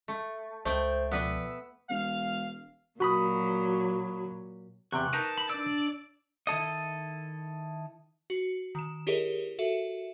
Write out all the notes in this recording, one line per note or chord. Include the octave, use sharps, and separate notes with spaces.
A3
C#2 A3 C5 D#5 G5
B2 F3 B3 B4 D5 E6
E1 F5
A#2 F#3 F#4 B5 D#6
E2 C3 G5 C#6 F#6
D#4 A#4 B4 A5
B5
D4 D5 E6
D#3 E4 A4 D#5
F#4
D#3 E7
E4 G4 G#4 A#4 C#5 D#5
F#4 A4 E5